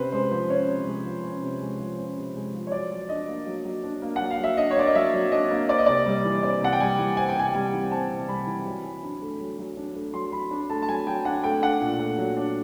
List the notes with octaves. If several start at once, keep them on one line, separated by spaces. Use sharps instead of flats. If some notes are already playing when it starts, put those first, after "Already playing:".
Already playing: C3 C#4 B4 C5
G#3 C5
F3 C5
C#4 C#5
C3
G#3
F3
C#4
C3
G#3
F3
C#4
C3
G#3
F3
C#5
F#3 D5
F#3
D4 D#5
A#3
F#3
F#3
D4
A#3
F#3 F#5
F5
F#3 E5
D4 D#5
C#5
A#3 D5
D#5
F#3 E5
F#3
D4 D#5
A#3
C4 D5
D#5
C3 D5
G3
E3
C4 D5
C3 F#5
G5
G3 G#5
E3
C4 G#5
G5
C3 G#5
G3 G#5
E3
C4 A5
C3
G3 B5
E3
F#3
F#3
D4
A3
F#3
F#3
D4
A3
F#3 C6
F#3 B5
D4
A3 A5
A5
F#3 G#5
F#3 G5
D4 F#5
A3 G5
D4 F#5
A#2
A3
F#3
D4